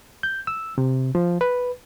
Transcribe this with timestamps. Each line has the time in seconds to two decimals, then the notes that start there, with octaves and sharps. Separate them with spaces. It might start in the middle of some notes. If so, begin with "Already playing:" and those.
0.23 G6
0.47 E6
0.78 C3
1.15 F3
1.41 B4